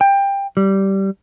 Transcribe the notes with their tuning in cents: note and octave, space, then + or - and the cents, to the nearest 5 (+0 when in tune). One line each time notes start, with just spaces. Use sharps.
G5 +20
G3 -10